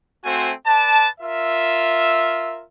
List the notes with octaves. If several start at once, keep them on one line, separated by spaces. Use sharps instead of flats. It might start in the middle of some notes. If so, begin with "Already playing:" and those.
A3 C4 F#4 C5 G#5
B4 D5 A5
F4 A#4 E5